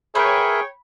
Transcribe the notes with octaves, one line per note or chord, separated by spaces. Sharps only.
G#4 A#4 B4 C#5 E5 G5